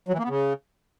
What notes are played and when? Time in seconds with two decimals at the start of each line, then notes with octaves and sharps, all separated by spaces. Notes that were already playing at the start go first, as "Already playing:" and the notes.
0.08 F#3
0.14 E3
0.19 A#3
0.24 B3
0.29 C#3